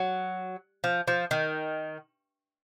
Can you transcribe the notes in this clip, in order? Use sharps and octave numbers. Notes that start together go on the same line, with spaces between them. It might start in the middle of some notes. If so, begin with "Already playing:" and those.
Already playing: F#3
F3
F3
D#3